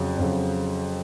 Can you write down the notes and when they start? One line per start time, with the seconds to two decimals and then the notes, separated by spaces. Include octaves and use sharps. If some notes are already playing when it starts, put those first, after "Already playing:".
Already playing: F2 C#3 F#3
0.18 F2 C#3 F#3